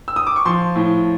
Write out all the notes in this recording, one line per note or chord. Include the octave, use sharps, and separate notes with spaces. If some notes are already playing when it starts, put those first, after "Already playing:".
E6
D#6
D6
C#6
F3 C6
A2